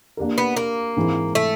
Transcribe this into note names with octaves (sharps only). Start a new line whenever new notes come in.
A#3 D4 G4 A#4
B3
A#3
G#2 E3 G#3 C4 E4
A3